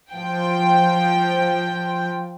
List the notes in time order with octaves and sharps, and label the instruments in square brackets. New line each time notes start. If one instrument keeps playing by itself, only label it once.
[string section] F3 G5